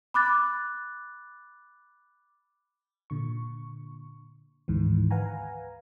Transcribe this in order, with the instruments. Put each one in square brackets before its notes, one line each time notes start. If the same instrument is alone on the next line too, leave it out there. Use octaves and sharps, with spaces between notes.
[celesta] B5 D6 F#6 A6
[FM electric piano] A#2 D3 C#6
D2 G#2 D#3 E3
B4 F5 F#5 G#5 A#5